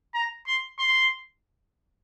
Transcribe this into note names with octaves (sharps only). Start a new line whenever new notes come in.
A#5
C6
C6